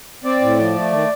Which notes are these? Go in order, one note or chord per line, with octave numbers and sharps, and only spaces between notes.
C4 D5
A2
F3
A3
D#3